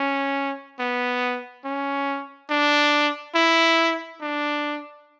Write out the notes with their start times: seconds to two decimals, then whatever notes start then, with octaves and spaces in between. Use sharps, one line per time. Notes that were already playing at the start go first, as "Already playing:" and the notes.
Already playing: C#4
0.79 B3
1.65 C#4
2.50 D4
3.35 E4
4.21 D4